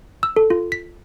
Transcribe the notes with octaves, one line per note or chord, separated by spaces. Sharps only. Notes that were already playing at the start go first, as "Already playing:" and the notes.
E6
A4
F4
B6